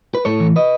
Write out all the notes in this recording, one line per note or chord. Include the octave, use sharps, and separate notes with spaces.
B4
A2 A4 C#5
E3
B4 D#5